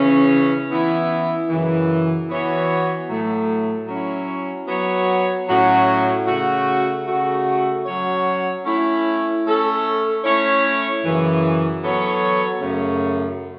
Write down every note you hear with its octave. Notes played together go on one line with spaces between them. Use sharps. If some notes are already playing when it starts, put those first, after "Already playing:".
Already playing: C#3 E3 C#4
E3 B3 E4
F#2 C#3 E3
E3 B3 F#4 C#5
A2 F#3 A3
F#3 C#4 E4
F#3 B3 F#4 C#5
A2 F#3 C#4 F#4 C#5
C#3 A3 F#4
C#3 A3 F#4
F#3 C#4 F#4 C#5
A3 C#4 E4
A3 C#4 A4
A3 C#4 E4 C#5
F#2 C#3 E3
F#3 B3 A4 C#5
F#2 C#3 A3 C#4